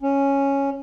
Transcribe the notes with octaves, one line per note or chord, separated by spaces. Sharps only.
C#4